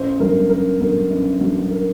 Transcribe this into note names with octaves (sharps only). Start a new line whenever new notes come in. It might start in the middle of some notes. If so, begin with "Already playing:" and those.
Already playing: A1 C5
G2 D3 F#3 A#4
A1 A#4
G2 D3 F#3 A#4
A1
G2 D3 F#3
A#4